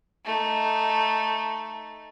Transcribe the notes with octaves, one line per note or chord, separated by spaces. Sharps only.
A3 D#4